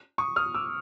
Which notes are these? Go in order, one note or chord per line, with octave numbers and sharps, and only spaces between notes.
C#6 D#6
D#6 F6
D6 E6